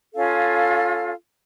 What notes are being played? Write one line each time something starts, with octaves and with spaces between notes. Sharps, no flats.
C#4 F4 A4 F5